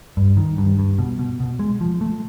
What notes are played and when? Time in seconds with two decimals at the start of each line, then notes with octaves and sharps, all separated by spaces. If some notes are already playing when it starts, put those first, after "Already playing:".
0.17 G2
0.37 D#3
0.58 G2
0.79 G2
0.99 B2
1.19 B2
1.40 B2
1.59 G#3
1.81 F3
2.01 A3